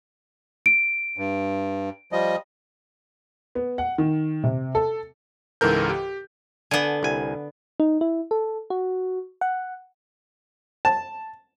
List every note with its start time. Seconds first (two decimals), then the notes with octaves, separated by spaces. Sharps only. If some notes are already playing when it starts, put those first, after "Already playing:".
0.66 D7
1.18 G2
2.12 F3 G3 D#5
3.55 B3
3.78 F#5
3.98 D#3
4.44 C3
4.75 A4
5.61 C#2 G#2 E3 A4 A#4 G6
5.89 G4
6.71 D3 B3 G#5
7.03 C2 G#5
7.80 D#4
8.01 E4
8.31 A4
8.70 F#4
9.41 F#5
10.85 A5